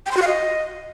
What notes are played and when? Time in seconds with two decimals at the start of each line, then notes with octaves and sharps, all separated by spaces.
0.06 G5
0.11 C6
0.17 F#4
0.22 F5
0.27 D#5